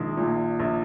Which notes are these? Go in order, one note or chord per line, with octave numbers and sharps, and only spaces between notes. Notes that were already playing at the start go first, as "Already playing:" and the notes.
Already playing: A#1 D#3 G#3
A#2
A#1